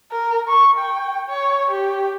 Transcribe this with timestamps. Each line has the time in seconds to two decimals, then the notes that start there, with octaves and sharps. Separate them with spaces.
0.12 A#4
0.48 C#6
0.79 G5
1.29 C#5
1.71 G4